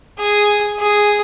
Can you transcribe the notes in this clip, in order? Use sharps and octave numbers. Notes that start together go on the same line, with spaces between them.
G#4
G#4